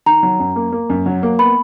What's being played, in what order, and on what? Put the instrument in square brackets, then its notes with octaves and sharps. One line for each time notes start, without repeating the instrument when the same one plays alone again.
[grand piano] D#3 [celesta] A#5
[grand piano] F#3
F#2
A#3
A#3
F#2
F#3
A#3
[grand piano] B3 [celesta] B5